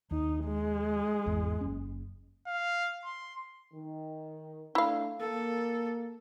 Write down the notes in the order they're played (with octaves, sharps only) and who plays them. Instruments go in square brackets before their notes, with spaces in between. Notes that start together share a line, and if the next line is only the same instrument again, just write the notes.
[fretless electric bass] D#2 [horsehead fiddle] D#4
[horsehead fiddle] G#3
[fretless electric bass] G#1 E2
F#1 C#4
[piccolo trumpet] F5
C6
[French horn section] D#3
[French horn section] A3 D4 [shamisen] E4 F5
[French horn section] A#3 [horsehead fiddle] A4